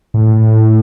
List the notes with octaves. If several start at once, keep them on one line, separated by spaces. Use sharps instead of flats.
A2